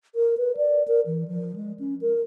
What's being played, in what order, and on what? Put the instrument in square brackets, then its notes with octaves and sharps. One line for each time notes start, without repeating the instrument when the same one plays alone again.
[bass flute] A#4
B4
D5
A#4
E3
F3
G#3
C#4
A#4